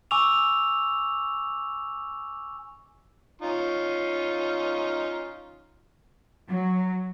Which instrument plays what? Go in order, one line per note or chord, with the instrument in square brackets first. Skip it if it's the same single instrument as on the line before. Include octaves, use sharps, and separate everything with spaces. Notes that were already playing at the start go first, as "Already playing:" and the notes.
[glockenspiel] G#5 C#6 D6 E6 F7
[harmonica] C#4 D#4 F4
[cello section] F#3